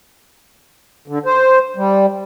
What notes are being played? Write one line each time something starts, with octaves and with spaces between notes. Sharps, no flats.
D3
C5
G3